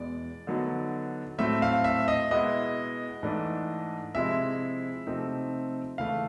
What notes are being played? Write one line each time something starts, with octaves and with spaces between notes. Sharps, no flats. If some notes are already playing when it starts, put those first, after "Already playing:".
Already playing: E2 B2 G#3 D5
D3 F#3 B3 D#4
A2 F#3 A3 C4 E5
F5
E5
D#5
B2 G#3 B3 E4 D#5
G#2 E3 A3 D4
C3 F3 G#3 C4 E4 E5
C3 F3 A3 C4 D#4
C#3 E3 A3 F5